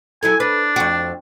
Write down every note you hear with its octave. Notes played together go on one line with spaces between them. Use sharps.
F#3 E4 A4 G#5
D4 B4
F2 F#4